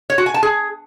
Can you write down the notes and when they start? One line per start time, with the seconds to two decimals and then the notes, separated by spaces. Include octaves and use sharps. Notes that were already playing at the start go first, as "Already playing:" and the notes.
0.10 C#5
0.18 F#4
0.26 G#5
0.34 A5
0.43 G#4